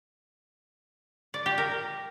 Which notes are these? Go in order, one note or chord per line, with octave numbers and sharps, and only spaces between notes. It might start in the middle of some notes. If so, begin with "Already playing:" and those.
D5
G4
A#4